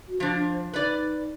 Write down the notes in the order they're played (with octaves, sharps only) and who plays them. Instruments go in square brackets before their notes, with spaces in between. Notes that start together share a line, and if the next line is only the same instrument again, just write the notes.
[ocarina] F#4
[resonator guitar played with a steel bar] F3 D4 [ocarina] C5
[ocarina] D#4 [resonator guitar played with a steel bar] B4 D5